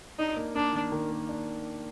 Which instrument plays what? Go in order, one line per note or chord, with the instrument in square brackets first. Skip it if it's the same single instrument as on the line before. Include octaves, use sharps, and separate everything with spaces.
[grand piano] D4 [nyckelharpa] D#4
[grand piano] A#3
[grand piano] A#3 [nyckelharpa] D4
[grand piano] D#3
D#3
A#3
D4